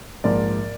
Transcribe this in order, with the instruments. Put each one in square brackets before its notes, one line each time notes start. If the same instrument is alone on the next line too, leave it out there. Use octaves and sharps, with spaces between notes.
[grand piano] A#1 G#2 F3 A#4 D5